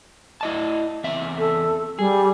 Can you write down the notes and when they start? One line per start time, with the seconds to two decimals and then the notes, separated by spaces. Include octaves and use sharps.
0.41 E4 D#5 A5
1.04 E2 C4 E5
1.39 A4
1.99 G3 G#4